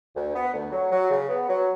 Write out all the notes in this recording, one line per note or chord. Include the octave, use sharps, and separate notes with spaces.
D2
B3
D2
F#3
F#3
C#3
B3
F#3